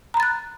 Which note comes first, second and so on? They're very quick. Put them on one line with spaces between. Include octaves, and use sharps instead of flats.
A#5 B5 A6 F#6